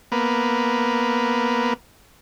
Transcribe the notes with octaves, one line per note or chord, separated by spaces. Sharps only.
A#3 B3